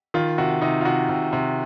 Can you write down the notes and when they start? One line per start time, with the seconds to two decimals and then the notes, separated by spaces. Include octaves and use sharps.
0.14 D#3 F4
0.38 C3 F#4
0.62 C3 D#4
0.81 F4
0.85 C3 F#4
1.09 C3
1.33 C3